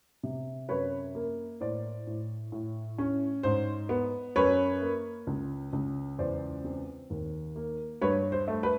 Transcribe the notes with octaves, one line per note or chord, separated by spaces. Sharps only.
C3
F#2 B4 C#5
A#3
A2 C5 D5
A2
A2
C#4
G#2 C5
B3
F#2 B4 C#5
A#3
C#2
C#2
E2 C5 D5
C4
D#2
A#3
G2 B4 C#5
C5
A3
B4